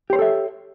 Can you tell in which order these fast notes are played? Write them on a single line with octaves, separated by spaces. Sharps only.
G4 C5 C#5 A4 E5